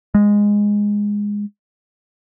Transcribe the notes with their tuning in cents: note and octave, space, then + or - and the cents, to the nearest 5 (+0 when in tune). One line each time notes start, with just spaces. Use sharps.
G#3 -10